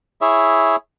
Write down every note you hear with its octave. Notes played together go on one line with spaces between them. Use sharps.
E4 G#4 C#5 E5